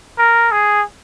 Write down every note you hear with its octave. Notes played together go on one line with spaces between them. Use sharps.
A#4
G#4